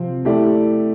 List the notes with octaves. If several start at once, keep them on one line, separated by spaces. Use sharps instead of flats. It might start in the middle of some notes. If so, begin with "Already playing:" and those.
Already playing: C3 F3 C4
A3 E4 G4 D5